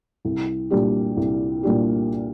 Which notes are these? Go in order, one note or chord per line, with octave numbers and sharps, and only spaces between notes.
C2
A#2 G3 D4 G4
C2
A#2 G3 D4 G4